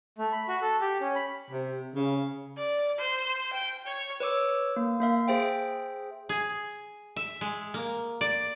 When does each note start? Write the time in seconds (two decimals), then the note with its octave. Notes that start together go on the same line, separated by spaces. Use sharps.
0.18 A3
0.32 B5
0.48 F#4
0.62 A4
0.81 G4
1.01 C#4
1.16 B5
1.51 C3
1.96 C#3
2.57 D5
2.99 C5
3.53 G5
3.86 C#5
4.20 B4 C#5 D6 E6
4.76 A#3
5.00 A#3 E5 F5
5.28 G#4 C5 E5 G5
6.29 G#4
7.16 E5
7.41 G#3
7.74 A#3
8.21 D5